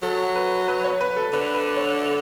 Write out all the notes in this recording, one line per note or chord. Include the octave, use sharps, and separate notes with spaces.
F#3 A4
B4
B4
C#5
B4
A4
D3 B4
B4
C#5